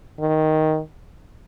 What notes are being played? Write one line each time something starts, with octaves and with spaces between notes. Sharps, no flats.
D#3